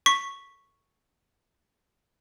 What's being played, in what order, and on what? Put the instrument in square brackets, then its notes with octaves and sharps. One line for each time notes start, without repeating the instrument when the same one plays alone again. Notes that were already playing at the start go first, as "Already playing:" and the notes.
[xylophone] C#6 B6